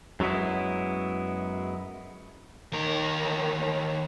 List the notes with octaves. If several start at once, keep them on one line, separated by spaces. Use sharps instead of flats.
F#2 F#3 G#3 B3 E4
D#2 A#4